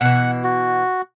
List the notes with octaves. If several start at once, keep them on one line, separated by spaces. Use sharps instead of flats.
B2 E3 F#5
F#4